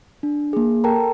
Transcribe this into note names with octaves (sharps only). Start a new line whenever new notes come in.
D4
A#3 G#4
A4 A#4 G5 A5 A#5